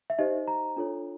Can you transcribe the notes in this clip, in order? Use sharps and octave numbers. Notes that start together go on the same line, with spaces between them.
E5
D#4 G4 C5 D#5
A#5
D4 F4 A4 C#5